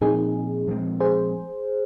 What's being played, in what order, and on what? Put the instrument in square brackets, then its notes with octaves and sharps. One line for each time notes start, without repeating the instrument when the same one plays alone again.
[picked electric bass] A#2 F3 C4 [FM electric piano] D#4 G#4
[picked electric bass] A#2 F3 G#3 C4
[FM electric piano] G#4 C5